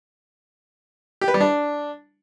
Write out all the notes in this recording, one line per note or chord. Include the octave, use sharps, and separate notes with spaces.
G4
B4
G3
D4